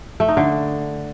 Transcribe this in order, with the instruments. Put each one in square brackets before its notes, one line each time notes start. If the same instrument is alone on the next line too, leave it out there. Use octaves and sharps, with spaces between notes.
[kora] A3
D#4
D3